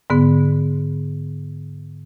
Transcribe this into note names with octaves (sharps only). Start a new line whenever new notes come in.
G#2 D3 B3